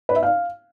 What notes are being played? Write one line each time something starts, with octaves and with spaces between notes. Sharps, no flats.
B4
E5
F5